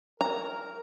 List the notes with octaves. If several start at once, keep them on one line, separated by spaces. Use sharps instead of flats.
A#4 A#5